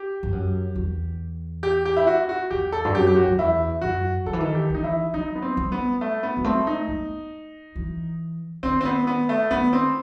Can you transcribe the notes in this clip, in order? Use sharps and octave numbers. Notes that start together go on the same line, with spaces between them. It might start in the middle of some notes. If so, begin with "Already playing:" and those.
Already playing: G4
G2
F#2
E2
G4
G4
E4
F#4
F#4
E2 G4
A4
G2
F#2 G4
G4
F#4
F#2
E2 E4
F#2 F#4
D#3 A4
E3
D#3 A4
G4
E3 D#4
E4
F#3 D#4
B3
C4
G3
B3
A3
B3
G3
A3 C4
D#4
B3
E3
D#3 C4
C4
B3
B3
A3
D#3 B3
C4